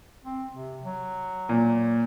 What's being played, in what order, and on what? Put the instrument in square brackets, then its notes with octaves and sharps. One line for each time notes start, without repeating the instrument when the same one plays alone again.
[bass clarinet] C4
C3
F#3
[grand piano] A#2